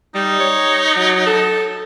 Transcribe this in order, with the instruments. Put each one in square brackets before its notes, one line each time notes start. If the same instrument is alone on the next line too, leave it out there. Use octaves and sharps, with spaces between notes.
[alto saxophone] G3 [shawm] D#4
[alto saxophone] C#5
F#3
A4